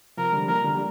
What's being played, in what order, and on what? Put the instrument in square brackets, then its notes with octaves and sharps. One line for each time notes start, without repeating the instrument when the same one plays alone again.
[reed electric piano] C3 F3 [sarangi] A#4
[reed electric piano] D3 G3
[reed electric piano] F3 A#3 [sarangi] A#4
[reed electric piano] D3 G3
G3